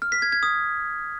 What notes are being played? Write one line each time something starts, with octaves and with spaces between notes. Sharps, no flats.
F6
B6
G#6
G#6
D#6